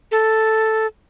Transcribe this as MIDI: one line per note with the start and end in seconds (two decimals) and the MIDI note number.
0.11 0.87 69